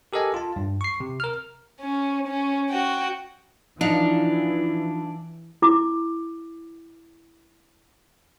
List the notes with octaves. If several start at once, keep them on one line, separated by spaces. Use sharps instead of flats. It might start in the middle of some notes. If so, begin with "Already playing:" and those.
G4 A4 A#4 D#5 G#5
F4 A5
G2
C#6 C7
C3
A#4 F6
C#4
C#4
F#4 G5
E3 F3 D4 D#4 F5
E4 D6